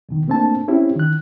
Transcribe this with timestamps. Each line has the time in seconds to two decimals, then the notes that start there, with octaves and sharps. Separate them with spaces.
0.09 E2 B2 D#3
0.28 A3 A#3 C4 D4 A5
0.68 C4 C#4 E4 G4
0.95 D#3 F#6